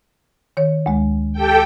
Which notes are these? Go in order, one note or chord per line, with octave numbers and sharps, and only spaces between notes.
D#3 C#5
D2 G#3
G4 A4 G5